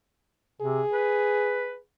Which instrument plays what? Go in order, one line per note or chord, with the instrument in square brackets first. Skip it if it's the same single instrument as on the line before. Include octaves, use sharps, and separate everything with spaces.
[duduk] C3 [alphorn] G#4
[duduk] B4